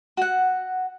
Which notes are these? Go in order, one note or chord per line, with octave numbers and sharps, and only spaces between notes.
F#4 F#5